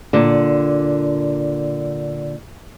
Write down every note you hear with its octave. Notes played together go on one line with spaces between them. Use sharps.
A#2 D3